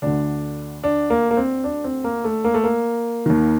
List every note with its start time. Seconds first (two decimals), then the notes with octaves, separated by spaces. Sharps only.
0.02 D2 D3 D4
0.84 D4
1.10 A#3
1.31 A#3
1.37 C4
1.64 D4
1.84 C4
2.04 A#3
2.24 A3
2.44 A#3
2.54 A3
2.64 A#3
3.26 D#2 D#3